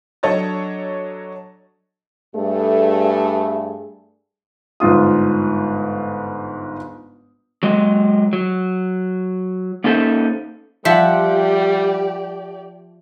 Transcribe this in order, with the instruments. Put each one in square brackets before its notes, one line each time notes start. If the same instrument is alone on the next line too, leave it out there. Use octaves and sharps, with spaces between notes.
[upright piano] F#3 D4 A4 C#5 D#5 A6
[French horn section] G2 A3 G#4
[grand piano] G1 G#2 F4 D#6
[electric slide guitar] F#3 G#3 D#5
F#3
A#3 C#4 D#4 A4 C5 E5
[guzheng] F3 [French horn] G3 [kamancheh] G4 D5 [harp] E5 F#5